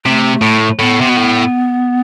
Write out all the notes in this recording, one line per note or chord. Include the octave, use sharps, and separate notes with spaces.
C3 A3
A2
A2 B3
C3
B2
A2